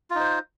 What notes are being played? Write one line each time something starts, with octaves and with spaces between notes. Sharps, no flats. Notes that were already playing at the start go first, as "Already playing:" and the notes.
D#4 F4 C5